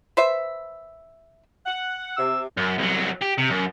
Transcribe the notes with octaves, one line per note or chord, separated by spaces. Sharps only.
B4 C5 E5
F#5
C3 E6
F#2
C2 F#3
G4
C3
F#2